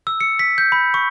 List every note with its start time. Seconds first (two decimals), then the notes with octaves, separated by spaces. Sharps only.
0.07 E6
0.20 C#7
0.39 B6
0.58 G6
0.72 B5
0.94 C#6